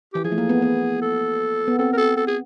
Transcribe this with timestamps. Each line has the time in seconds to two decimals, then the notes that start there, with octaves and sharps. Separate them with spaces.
0.14 E3 G4
0.24 F3 G#4
0.32 A3
0.38 A#3
0.49 B3
0.62 B3
1.02 A4
1.68 B3
1.78 C4 A4
1.93 A#4
1.97 A4
2.17 A4
2.27 G#4